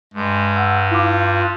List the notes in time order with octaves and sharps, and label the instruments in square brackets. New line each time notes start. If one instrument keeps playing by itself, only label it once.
[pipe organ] G2 [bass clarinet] G#3
[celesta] F#5 E6
[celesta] E4 D6 [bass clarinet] F4